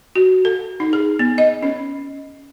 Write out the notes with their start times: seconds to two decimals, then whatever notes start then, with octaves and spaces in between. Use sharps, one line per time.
0.16 F#4
0.45 A4
0.80 D#4
0.93 G#4
1.19 B3
1.38 D#5
1.63 C#4